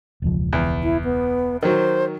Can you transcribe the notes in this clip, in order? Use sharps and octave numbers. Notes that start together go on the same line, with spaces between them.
E1 C#2 F3
E2
E4
B3
D#3 F#3 C5